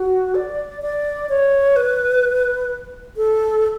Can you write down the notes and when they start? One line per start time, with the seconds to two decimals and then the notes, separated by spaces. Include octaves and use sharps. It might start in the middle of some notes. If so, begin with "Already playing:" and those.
Already playing: F#4
0.35 D5
0.82 D5
1.29 C#5
1.76 B4
3.17 A4